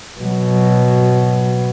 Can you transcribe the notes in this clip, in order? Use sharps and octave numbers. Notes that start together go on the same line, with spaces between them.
B2 F#3